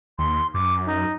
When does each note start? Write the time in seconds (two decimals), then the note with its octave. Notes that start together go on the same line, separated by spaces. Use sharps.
0.19 D#2 C6
0.54 F#2 D6
0.86 D#4